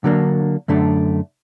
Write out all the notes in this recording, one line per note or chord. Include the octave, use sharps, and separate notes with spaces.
D3 F#3 A#3 D4
F#2 D3 A3 D4